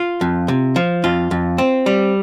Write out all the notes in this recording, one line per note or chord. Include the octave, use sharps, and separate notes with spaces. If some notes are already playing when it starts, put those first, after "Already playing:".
Already playing: F4
F2
C3
F3
F2 F4
F2
C4
G3